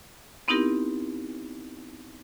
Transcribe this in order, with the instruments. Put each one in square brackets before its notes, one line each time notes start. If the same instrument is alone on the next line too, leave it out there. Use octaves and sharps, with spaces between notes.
[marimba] B3 C4 D#4 E4 G4 A#4